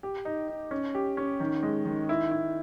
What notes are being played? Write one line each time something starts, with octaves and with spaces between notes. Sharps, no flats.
G4
D#4
D#4
C#4
G4
C#4
D#3
G#3
D#3
E4
E4